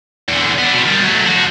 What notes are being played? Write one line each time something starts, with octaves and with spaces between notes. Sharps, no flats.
E2 D3
B3 D4
B2 C4
D#3 G3
F#3 A3
F3 F#4